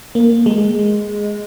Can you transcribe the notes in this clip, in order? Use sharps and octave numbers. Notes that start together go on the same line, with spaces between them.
A#3
G#3